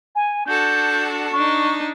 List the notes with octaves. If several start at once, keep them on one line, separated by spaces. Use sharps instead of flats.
G#5
D4 F#4 A4 G6
D4 D#4 C#6